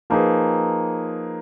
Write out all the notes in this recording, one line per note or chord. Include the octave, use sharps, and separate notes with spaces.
F3 A#3 D#4 G#4 B4